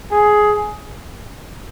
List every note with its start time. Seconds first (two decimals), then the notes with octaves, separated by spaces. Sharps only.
0.11 G#4